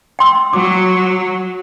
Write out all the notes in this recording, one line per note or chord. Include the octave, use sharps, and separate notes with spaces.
G5 C6 E6
F#3 D6